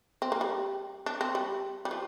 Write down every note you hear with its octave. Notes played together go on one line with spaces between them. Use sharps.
C4
A#3
G3
D4
C4
G3
G3
F3